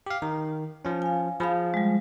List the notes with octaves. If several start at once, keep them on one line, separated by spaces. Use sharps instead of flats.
G4 F5
D#3 A#5
F3 C#4
F5 G#5
F3 G#4 F5 B5
G3 G#3